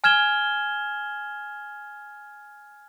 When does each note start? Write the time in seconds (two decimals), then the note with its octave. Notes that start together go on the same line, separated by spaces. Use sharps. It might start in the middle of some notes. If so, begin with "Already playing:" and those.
0.04 G#5 F6 G#6 E7 G7